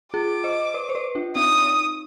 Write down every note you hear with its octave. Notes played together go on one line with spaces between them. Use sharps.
F4 G#4 D6
C5 D#5
B4 D5
C5
B4 D5
D4 F4
C4 D#4 D#6